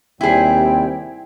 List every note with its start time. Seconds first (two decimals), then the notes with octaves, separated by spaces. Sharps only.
0.21 D#2 C3 G3 C4 E4 G#4 G5